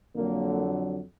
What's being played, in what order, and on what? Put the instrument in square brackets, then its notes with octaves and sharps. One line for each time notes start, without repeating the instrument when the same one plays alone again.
[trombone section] F2 D3 F#3 A#3